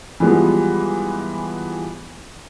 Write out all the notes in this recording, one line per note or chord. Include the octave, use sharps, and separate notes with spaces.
E3 F3 G3 G#3 B3